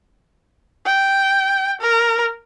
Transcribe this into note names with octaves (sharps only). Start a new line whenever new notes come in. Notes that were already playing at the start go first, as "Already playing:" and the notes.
G5
A#4